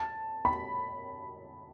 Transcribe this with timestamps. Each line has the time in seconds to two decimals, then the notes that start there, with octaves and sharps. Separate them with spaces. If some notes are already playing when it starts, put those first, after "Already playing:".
Already playing: A5
0.45 B5